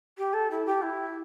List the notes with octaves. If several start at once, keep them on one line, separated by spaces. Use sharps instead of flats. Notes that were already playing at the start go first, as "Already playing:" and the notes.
G4
A4
E4
G4
E4